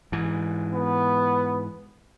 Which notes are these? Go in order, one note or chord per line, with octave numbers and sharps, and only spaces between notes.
G#2 E3
B3